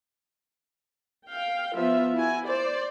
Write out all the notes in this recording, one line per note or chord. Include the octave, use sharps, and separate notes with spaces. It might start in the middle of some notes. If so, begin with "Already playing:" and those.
F5 G5
F3 B3 F4 E5
E4 F#4 G#5
C5 D5